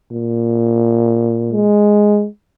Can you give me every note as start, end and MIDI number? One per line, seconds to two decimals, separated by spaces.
0.11 1.70 46
1.53 2.27 56